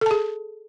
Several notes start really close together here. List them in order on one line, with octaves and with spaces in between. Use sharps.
A4 A5 G#4